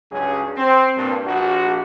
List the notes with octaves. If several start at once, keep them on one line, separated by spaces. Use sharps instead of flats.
C#2 G2 C#3 F#3 C#4 G#4
C4
G2 A#2
A#1 F#4